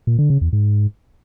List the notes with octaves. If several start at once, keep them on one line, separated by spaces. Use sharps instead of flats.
A#2
D3
C#3
E2
G#2